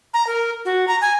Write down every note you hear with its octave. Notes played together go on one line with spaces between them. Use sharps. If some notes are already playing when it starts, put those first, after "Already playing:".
A#5
A#4
F#4
A#5
G#5